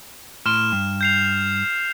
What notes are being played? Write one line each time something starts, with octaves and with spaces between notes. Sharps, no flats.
A2 C6 F6 E7
G2
G6 C7 F7